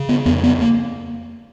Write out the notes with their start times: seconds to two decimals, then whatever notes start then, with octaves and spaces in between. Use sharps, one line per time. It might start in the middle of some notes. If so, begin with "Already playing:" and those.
Already playing: C#3
0.09 B3
0.25 F2 B3
0.43 B3
0.61 A#3